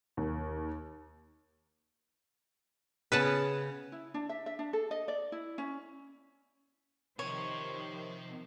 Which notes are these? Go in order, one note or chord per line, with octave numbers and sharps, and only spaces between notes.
D#2
C#3 B3 B4 F#5 A5
E4
D4
E5
E5
D4
A4
D#5
D5
E4
C#4
C3 D#3 F3 C5 C#5